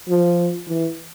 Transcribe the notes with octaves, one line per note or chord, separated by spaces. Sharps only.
F3
E3